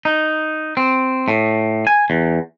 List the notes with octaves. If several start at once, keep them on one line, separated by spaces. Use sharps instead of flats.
D#4
C4
A2
G#5
E2